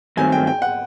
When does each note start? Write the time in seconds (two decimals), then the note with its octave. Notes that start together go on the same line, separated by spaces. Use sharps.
0.17 G2 D#3 F#3 A3 C4 G#5
0.32 G5
0.47 G5
0.62 F#5